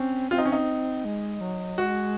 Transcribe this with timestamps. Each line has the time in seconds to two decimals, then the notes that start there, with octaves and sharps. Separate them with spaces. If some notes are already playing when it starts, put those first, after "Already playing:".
Already playing: C4 C#4
0.31 C4 F4
0.38 D#4
0.45 C#4
0.52 D#4
1.05 G#3
1.41 F#3
1.78 G#3 F#4